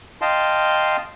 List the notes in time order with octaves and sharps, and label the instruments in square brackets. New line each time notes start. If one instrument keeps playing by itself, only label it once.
[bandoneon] D#5 F5 G5 A5 C6